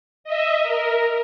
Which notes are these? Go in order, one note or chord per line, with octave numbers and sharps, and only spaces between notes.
D#5 E5
A#4